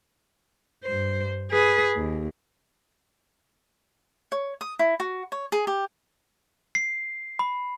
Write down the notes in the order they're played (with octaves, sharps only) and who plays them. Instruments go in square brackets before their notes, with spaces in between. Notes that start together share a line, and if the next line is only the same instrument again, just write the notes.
[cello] G2 C5
G#4 B4
D#2
[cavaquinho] C#5
D#6
E4
F#4
C#5
G#4
G4
[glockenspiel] C7
B5